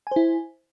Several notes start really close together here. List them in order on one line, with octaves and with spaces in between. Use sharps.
G#5 C5 E4